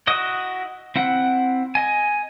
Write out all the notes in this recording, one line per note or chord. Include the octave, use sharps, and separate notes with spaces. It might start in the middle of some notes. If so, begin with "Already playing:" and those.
E4 F#4 D#5 D#6
C4 E4 F#5
D#5 G#5